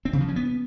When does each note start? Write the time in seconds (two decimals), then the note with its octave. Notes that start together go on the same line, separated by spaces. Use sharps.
0.05 C4
0.13 C#3
0.21 F3
0.28 C#4
0.36 B3